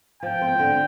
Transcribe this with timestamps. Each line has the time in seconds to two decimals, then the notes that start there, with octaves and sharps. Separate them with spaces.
0.23 F3 G5
0.41 C4
0.59 D3